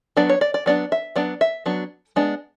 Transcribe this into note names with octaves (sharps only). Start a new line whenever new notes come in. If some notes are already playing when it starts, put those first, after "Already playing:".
F#3 B3 D4 D5
C#5
D5
D5
F#3 B3 D4 D5
E5
F#3 B3 D4 D5
E5
F#3 B3 D4
G#3 B3 D4